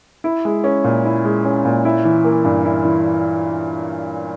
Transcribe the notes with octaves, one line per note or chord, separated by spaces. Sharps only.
E4
G#3
C#4
A#2
E4
G#3
C#4
A#2
E4
E3
A#3
G2
E4
E3